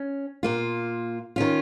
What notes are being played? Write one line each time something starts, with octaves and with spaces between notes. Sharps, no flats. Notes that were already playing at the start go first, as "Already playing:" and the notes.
Already playing: C#4
A#2 A#3 F4
D#3 C#4 F4